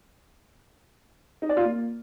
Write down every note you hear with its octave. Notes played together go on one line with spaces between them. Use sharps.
D#4
D5
F4
A#3